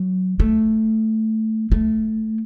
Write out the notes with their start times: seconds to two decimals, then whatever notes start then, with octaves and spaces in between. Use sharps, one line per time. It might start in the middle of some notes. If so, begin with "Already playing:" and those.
Already playing: F#3
0.40 A3
1.72 A3